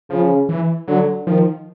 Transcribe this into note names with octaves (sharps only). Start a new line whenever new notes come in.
C#3 F3
E3
D3 F#3
D#3 F3